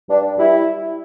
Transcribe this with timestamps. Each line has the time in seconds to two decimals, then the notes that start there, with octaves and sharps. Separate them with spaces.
0.10 G2 D4
0.38 G3 E4